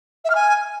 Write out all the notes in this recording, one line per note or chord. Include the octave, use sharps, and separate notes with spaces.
E5
F6
G#5